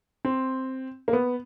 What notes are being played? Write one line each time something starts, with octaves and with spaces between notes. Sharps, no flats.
C4
A#3
B3